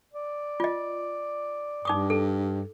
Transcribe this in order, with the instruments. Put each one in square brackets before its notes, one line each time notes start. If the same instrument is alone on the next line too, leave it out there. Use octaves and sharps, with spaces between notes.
[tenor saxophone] D5
[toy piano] F4 D#5
[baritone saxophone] G2 [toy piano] D#4 D6 D#6
[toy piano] A4